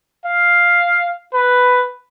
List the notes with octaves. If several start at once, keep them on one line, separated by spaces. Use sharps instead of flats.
F5
B4